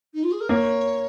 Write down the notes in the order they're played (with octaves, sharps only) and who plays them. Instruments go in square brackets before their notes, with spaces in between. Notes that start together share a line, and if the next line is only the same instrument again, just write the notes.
[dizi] D#4
F4
G#4
A#4
[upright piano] A#3 [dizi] C#5